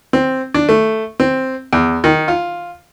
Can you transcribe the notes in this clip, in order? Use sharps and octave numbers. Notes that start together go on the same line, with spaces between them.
C4
D4
A3
C4
E2
D#3
F4